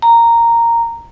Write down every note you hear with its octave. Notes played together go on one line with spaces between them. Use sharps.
A#5